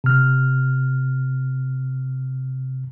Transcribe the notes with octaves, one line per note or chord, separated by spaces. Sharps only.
C3 F6